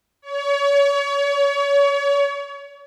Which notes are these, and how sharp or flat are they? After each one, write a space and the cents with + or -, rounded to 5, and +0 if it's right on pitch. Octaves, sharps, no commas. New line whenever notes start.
C#5 +30